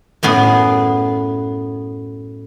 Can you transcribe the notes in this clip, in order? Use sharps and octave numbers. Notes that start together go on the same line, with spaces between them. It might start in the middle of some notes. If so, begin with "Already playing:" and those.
F#2 A2 B3 G#4